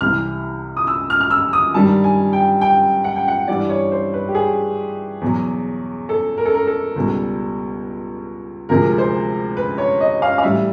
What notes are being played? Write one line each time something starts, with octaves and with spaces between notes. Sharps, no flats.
C2 C3 E3 F6
D#6
E6
F6
F6
E6
D#6
G2 D#3 G3 A5
G#5
G5
G5
F#5
G5
F#5
G2 E3 G3 D5
C#5
C5
B4
G4
G#4
E2 B2 F#3
A4
A#4
A4
A#4
A4
C#2 B2 G3
D2 C3 F3 G#3 A#4
C5
B4
C#5
D#5
F5
F5
A2 E3 G3 E5